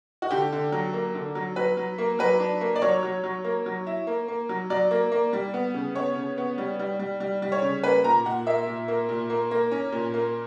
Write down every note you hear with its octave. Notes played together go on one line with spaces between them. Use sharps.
F#4
D3 G4
D3
F#3
A#3
D3
F#3
F#3 B4
F#3
A#3
F#3 B4
D4
A#3
D5
F#3 C#5
F#3
F#3
A#3
F#3
E4
A#3
A#3
F#3
F#3 D5
A#3
A#3
G3
B3
C#3
B3 C#5
C#3
B3
G3
G3
G3
G3
G3
C#5
C#3
A#3 B4
A#2 A#5
A#2 F#5
A#3 E5
A#2
A#3
A#2
A#3
A#3
C#4
A#2
A#3